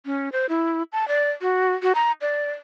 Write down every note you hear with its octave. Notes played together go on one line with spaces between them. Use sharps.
C#4
C5
E4
A5
D5
F#4
F#4
A#5
D5